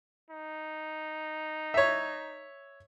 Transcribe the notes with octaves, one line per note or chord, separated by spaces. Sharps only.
D#4
C#5 E5